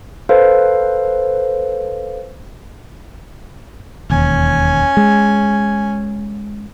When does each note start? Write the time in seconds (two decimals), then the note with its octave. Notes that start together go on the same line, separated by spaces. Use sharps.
0.29 A4 B4 C5 F5
4.10 E1 D#2 C#4 G#5
4.97 G#3